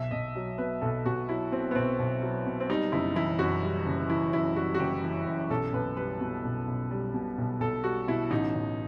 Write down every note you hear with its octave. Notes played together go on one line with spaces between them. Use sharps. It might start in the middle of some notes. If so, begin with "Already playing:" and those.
Already playing: B1 E5
B1 D#5
F#3
B2 B4
B1 A4
B1 F#4
F#3 E4
B2 C4
B3
B1 C4
B1
F#3
B2
C4
G3 D#4
F#1 E4
E3 E4
F#2 F#4
G3
F#1
E3 E4
F#2 E4
G3 F#4
F#4
F#1 G4
E3
F#2
B1 A4
B1 B4
G3 B4
B2
B1
B1
G3
B2
B1
B1 A4
G3 F#4
B2 E4
A1 D#4
A1